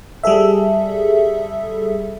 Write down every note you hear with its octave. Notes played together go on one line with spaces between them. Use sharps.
G3 G#4 A4 E5